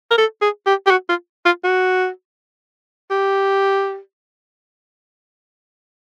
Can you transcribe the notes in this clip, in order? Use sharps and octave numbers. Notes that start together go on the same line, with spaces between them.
A#4
A4
G#4
G4
G4
F#4
F4
F4
F#4
G4